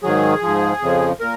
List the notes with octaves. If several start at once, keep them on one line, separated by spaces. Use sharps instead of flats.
G#2 D#3 F#3 G#4
G#2 F3
F2 C#3 F3
A#2 A#4